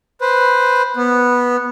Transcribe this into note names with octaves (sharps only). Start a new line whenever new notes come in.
B4 C5
B3